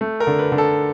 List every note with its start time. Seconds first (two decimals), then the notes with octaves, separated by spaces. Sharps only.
0.01 A3
0.20 A#4
0.27 D3
0.39 B4
0.52 D3
0.58 A4